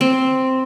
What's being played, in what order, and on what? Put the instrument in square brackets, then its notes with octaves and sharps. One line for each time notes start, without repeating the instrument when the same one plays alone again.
[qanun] C4